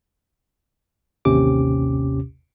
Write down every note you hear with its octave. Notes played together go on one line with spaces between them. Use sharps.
A1 D#2 C3 C#4 G4 D6